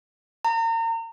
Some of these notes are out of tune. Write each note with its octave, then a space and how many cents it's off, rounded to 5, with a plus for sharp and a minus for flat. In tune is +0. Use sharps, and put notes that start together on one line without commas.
A#5 -35